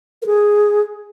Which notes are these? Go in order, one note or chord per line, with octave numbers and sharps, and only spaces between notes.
A#4
G#4